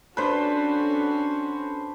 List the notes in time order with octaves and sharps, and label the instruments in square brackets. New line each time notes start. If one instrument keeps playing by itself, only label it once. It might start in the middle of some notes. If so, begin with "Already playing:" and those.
[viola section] C#4 F#4 A4 [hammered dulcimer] D4 D5 G#5 [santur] B4 C5